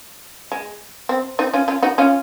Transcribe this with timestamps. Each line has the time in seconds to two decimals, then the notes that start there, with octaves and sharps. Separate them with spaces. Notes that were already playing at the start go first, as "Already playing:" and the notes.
0.52 G#3
1.09 C4
1.39 C4 D#4
1.54 C#4 F4
1.68 C#4 F4
1.83 D#4 F#4
1.98 C#4 F4